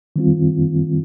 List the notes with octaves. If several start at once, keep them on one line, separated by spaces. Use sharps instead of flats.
D#3 G3 C4 F4